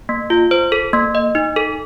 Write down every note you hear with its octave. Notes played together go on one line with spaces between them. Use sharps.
A#3
F4
C5
A4
A#3
D#5
D#4
A4